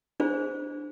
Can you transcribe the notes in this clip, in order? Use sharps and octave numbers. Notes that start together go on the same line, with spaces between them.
D4 G#4 C5